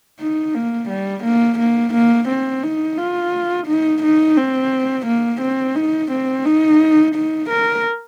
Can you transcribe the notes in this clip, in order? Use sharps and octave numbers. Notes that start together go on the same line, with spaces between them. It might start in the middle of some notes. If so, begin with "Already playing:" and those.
D#4
A#3
G3
A#3
A#3
A#3
C4
D#4
F4
D#4
D#4
C4
A#3
C4
D#4
C4
D#4
D#4
A#4